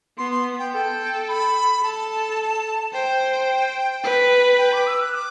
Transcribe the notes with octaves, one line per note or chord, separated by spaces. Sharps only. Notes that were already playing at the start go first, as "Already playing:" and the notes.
B3 C6
C6
G5
A4 G5
B5
A4 A5
C5 G5
B4
G5
D6
E6
F#6
D6